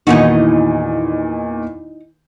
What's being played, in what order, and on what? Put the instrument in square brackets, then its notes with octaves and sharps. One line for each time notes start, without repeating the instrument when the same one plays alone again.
[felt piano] E2 A#2 D#3 [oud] D#4 E4 F#4